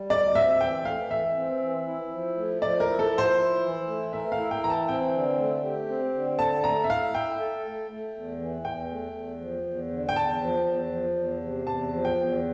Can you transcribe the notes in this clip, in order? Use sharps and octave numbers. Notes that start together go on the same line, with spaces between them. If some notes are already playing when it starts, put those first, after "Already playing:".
Already playing: G3
D2 D5
C4 E5
E3 G5
A3 F5
E3 E5
C4
E3
E4
F3
A3
F3 D5
A#4
E4
A4
F3
C5
E4
E3
A3
A#4 E5
F5
E4
G5
E3 A#5
A5
C4 G5
D3
A3
G4
C4
D3
A4 A5
A3 A#5
E5
E4 F5
E5 G5
A4
A3
A3
E2
E3
E2 G5
A3
E2
F3
E2
D3
G5
E2 A5
F3
E2
F3
E2
C3
E2 A5
F3
G5
E2